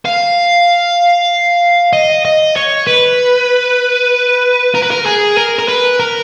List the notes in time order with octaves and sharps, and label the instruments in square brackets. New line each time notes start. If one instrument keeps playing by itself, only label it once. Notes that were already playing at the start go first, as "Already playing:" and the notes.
[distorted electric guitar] F5
D#5
D#5
C#5
B4
A#4
B4
A#4
G#4
A#4
A#4
B4
A#4